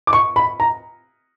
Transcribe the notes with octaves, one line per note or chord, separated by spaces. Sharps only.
D6
C#6
B5
A#5